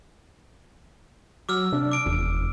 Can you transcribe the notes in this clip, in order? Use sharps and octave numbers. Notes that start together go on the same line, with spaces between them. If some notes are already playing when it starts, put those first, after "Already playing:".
F#3 D6 E6 F6
C3 D4
D6 D7
F1 E2